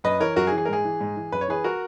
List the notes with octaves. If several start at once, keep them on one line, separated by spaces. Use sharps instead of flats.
F#2 B4 D#5
E3 A#4 C#5
F#2 F#4 A#4
G#4
E3
G#4
A#4
G#2 G#4
E3
G#2
E3
F#2 B4
C#5
E3 G#4 B4
F#4 A#4